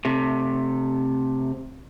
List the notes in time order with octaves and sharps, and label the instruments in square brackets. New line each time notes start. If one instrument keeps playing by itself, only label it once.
[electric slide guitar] C3 A3